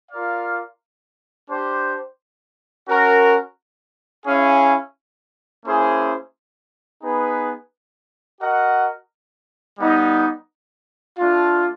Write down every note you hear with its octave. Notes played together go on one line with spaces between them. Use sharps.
F4 A#4 D5 F5
D4 G4 C5
C#4 F#4 A#4
C#4 E4 G#4 C#5 F5
A#3 C#4 E4 G#4 C5
B3 D#4 G#4 B4
F#4 A#4 D#5 F#5
G3 B3 D#4
A3 D4 F4